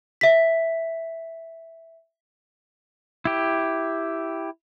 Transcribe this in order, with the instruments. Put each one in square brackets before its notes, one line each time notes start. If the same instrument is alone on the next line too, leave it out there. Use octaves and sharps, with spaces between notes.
[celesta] E5 B6
[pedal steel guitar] E4 G4